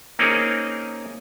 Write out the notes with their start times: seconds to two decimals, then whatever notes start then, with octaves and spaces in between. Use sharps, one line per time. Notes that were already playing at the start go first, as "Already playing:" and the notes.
0.19 A#3 C4 C#4 D#4 G#4 A#4